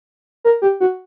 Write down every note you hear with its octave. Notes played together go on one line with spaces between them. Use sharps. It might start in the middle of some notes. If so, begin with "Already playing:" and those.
A#4
G4
F#4